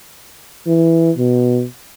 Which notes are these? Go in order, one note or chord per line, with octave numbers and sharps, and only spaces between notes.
E3
B2